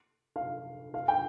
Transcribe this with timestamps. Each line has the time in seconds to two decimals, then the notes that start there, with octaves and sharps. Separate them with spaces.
0.36 F5
0.94 F5
1.08 G5